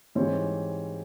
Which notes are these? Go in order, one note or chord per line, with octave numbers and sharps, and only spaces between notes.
G#2 E3 G3 C4 C#5